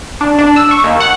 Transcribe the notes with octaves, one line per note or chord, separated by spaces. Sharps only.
D4
D4
E6
C#6
D#2
F#5